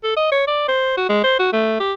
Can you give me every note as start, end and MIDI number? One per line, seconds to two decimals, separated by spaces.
0.03 0.14 69
0.16 0.29 75
0.32 0.44 73
0.47 0.67 74
0.68 0.95 72
0.97 1.05 66
1.09 1.22 56
1.24 1.38 72
1.39 1.49 66
1.52 1.76 57
1.80 1.93 67